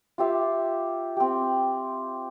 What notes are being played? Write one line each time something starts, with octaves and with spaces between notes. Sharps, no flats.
F4 G4 E5 F5
C4 G4